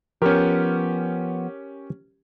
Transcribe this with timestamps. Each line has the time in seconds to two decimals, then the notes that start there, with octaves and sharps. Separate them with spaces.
0.22 F3 B3 C#4 G4 A#4